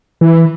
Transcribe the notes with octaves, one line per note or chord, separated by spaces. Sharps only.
E3